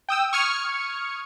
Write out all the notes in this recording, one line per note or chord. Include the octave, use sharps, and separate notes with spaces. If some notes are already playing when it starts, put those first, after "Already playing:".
G5 D#6 E6
C#6 D#6 F6 G#6 C#7